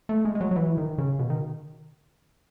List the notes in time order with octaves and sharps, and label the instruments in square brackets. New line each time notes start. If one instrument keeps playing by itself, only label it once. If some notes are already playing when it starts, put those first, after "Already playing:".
[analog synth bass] A3
G#3
G#3
F#3
F#3
E3
D#3
C#3
B2
D#3